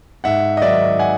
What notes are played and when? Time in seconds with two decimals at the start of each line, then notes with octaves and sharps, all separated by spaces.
0.24 G#2 E5 F#5
0.57 D#5
0.62 D#3 F#3 D5 E5
0.99 F#5 G#5